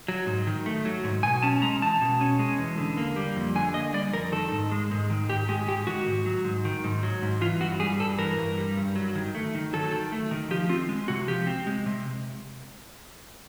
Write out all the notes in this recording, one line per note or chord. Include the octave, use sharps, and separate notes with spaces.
F#3
G#2
D#3
A3
F#3
G#2
B2 G#5
C#4 A5
G#3 A#5
E2 A5
B2
C#4
G#3
E2
D3
A#3
G3
F2
D3 G#5
A#3 D#5
G3 D5
F2 A#4
D#3 A4
G#2
G#3
G#2
D#3
G#2 G4
G#3 G4
G#2 G4
D#3 F#4
G#2
F#3
G#2
D#3
G#2
F#3
G#2
E3 F4
G2 F#4
G3 G#4
G2 A4
E3 A#4
G2
G3
G2
F#3
D#3
A3
D#3
F#3 A4
D#3
A3
D#3
F3 G4
C4 F4
G#3
C3 F#4
F3 G4
C4
G#3
C3